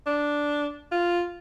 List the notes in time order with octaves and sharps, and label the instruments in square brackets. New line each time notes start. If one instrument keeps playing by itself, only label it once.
[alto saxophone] D4
F4